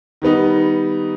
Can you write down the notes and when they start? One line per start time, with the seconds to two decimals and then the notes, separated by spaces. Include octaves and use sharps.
0.22 D#3 G3 B3 D#4